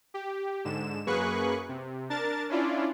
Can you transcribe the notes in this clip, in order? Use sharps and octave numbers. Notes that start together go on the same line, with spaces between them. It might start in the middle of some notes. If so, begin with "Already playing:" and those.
G4
G#2 D3 E7
F#2 A#3 G#4 B4 C#6 F#6
C3
D4 A#4 A5 A6
C#4 D4 E4 F4 D5